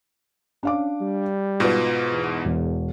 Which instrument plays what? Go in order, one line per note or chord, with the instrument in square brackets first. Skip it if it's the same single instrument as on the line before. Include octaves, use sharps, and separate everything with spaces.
[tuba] C#4 [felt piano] D4 F5 D6
[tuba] G3
[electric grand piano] G#2 B2 [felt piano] F4 B4
[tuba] E2
[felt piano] E1